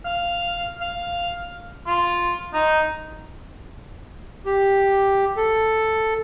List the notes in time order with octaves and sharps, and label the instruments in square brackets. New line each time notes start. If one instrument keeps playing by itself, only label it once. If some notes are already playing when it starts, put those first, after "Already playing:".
[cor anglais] F5
F5
F4
D#4
[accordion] G4
A4